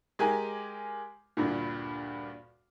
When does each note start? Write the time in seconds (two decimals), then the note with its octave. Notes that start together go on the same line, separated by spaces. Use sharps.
0.19 G#3 G4 A#4 G#5
1.37 D2 G2 A#2